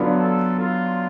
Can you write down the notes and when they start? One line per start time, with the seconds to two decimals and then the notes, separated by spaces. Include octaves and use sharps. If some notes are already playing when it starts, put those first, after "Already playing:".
Already playing: D3 F#3 B3 D4 F4
0.18 A4
0.59 F4